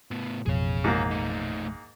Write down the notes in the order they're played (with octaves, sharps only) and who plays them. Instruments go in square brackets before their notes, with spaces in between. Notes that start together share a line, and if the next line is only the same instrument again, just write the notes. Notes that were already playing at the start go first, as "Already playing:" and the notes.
[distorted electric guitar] A2 B3
[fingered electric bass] A1 F2 B2 [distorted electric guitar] G#4 C#5
[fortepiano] G#2 A#3
[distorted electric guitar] A3 D#4